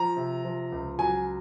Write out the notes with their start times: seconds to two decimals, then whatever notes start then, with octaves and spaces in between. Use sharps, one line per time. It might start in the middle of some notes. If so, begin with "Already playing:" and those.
Already playing: F3 A#5
0.17 C3
0.45 F3
0.72 C#2
0.99 F#3 G#5